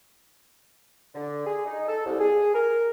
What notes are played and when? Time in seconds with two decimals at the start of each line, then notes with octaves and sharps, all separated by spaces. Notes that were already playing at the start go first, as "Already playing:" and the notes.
1.14 D3
1.45 G#4
1.66 D#4
1.87 A4
2.05 C2
2.19 G#4
2.54 A#4